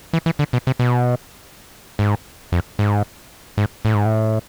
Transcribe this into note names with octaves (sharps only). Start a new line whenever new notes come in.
E3
E3
D3
B2
C3
B2
G#2
F2
G#2
G#2
A2
G#2
A2